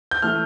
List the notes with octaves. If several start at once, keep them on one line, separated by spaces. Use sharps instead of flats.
G6
E3 A3 F6